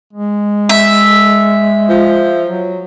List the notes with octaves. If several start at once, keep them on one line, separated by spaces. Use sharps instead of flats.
G#3
E5
F3
F#3